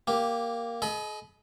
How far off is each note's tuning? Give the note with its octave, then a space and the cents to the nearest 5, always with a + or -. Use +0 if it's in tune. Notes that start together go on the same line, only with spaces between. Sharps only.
A#3 +0 G4 +0
G#4 +45 D#5 +0 B5 +0